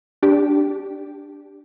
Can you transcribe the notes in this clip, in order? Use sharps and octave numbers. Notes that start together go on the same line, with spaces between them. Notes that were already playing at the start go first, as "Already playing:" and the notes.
D4 G4